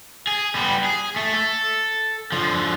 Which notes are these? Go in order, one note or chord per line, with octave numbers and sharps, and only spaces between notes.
G#4
G3 B3
G#4
A3
A4
D3 F3